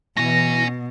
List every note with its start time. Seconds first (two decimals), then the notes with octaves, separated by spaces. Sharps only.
0.17 B2 E3 C#4 G#5 A#6